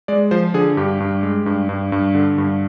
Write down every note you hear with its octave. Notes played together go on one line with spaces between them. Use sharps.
G#3 D5
F3 C5
D3 G#4
G2 G4
G2
G#3
G2
G2
G2
D3
G2